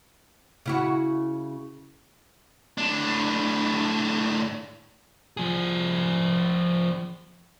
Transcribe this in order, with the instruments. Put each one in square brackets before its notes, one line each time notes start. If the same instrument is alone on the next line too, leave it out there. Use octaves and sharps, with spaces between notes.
[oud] C#3 E4 F#4
[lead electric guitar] A2 D4
F3 G#4